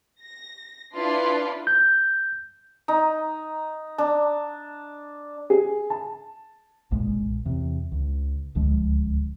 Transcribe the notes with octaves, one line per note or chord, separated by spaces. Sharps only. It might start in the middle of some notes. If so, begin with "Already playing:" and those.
A#6
D4 E4 F4 B4 D5 C6
G6
D#4
D4
G#4
A5
F#1 B1 A#2 G#3
E2 C3
C#2
D1 C#2 F3 G#3